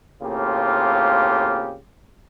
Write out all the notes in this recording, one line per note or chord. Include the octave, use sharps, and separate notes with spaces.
A2 C#3 A#3 C4 F4 G4